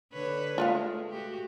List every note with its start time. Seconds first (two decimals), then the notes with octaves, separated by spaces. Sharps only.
0.12 D3 B4 C#5
0.58 G#3 A3 F4 B4 F5
1.10 F#4 G4